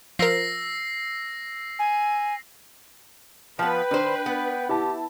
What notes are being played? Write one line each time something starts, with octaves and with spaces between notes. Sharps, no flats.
F3 A#4 E6 A#6 C7
G#5
F3 B3 B4 G5
D#3 D4 C5
B3
E4 G4 A5